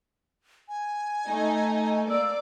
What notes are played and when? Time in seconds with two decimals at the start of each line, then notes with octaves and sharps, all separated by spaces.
0.69 G#5
1.28 A3 D#4
2.10 A#3 D5 E6